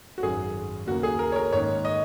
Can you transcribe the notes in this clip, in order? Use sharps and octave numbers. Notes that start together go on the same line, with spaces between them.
F#4
G#1 F#2 F#3 G#4
D#2 C#3 A#3 F#4
G#4
A#4
C#5
A#4
G#2 D#3 A#3 C#4 C#5
D#5